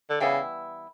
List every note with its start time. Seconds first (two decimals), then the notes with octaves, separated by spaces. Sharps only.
0.10 D3
0.20 C#3 E3 G3 B3 E4